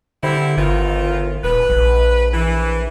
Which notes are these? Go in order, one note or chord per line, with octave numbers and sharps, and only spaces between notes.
D3 G3 C4 E4
G1 D#3 E3 F4
D#1 B4
A#1
E3